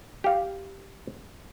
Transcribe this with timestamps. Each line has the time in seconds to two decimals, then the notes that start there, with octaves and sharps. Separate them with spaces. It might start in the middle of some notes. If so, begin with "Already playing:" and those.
0.24 G4 F5